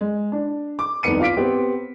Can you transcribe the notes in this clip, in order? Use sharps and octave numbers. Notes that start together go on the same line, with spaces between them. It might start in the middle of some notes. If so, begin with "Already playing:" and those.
G#3
D4
D6
F1 C2 D#3 B3 C#7 D#7
F4 F5 D6 B6 D7
B3 C4 G4 C5